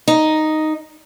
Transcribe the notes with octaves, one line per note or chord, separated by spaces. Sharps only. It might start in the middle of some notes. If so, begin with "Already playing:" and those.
D#4